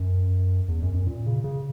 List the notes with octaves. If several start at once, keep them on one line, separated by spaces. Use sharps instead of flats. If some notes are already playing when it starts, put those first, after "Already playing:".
Already playing: F#2
E2
F#2
F#2
A#2
C#3
C#3